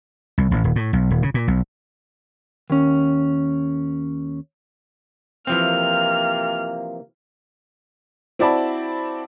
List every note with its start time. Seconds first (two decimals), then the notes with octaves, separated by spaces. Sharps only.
0.38 C2
0.51 A1
0.64 D#1
0.76 A2
0.93 B1
1.11 D#1
1.23 C#3
1.34 A#2
1.48 B1
2.70 D#2 C#4
5.47 C3 E3 F3 A#3 C4 F6
8.39 C4 E4 F#4 D5 A5 B5